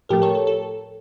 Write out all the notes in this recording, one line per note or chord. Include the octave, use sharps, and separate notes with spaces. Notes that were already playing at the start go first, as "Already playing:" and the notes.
A2 F3 A3 G4 A#4
A4 C#5
A4
A4